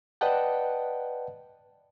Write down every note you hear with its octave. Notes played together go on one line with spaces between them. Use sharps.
B4 D5 D#5 F#5 G5 A5